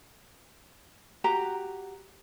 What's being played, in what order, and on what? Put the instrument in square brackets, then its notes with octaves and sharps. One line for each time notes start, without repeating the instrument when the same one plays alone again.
[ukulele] F#4 G4 A#5